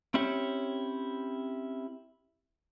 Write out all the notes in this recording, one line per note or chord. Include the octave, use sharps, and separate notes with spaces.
C4 C#4 E4 G4 C#5